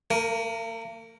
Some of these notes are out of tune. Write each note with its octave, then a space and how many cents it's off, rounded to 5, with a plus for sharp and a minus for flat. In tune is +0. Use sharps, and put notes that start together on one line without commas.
A#3 -45 A#4 +5